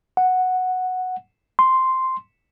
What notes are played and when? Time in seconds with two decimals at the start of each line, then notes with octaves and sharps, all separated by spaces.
0.17 F#5
1.59 C6